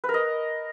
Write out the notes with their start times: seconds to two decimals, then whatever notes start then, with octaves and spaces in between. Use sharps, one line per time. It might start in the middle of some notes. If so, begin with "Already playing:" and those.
0.04 B4
0.09 A#4
0.14 D#5